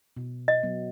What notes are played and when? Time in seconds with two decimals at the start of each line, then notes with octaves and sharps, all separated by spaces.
0.17 B2
0.48 D#5
0.63 F#3 B3